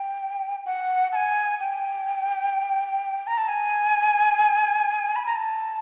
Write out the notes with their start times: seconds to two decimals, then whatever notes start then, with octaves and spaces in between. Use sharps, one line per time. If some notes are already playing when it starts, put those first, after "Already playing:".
Already playing: G5
0.66 F#5
1.12 A5
1.16 G#5
1.60 G5
3.27 A#5
3.38 A5
3.48 G#5
5.16 B5
5.26 A#5
5.36 A5